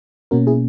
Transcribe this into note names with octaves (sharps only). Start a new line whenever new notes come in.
B2 A#3 C#4 F#4 A#4
E4 G#4